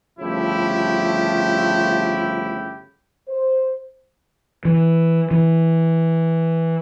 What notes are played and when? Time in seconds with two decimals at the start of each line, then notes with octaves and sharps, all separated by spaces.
0.20 G1 C#3 F3 A3 E4 G4
3.28 C5
4.65 E3
5.31 E3